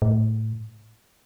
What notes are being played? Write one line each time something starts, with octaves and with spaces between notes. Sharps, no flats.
A2